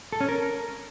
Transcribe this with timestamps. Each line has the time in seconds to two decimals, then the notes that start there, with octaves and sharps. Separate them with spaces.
0.12 A4
0.20 C#4
0.29 A#4